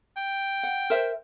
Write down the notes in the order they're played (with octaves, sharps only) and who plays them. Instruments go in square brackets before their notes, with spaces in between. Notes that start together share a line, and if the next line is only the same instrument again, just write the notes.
[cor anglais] G5
[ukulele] F#5
A#4 C5 E5